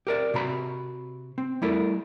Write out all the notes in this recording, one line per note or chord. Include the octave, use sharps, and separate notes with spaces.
G4 A#4 D5
C3 C4 F#4 A#5 B5
C4
G3 A3 E4 A4 A#4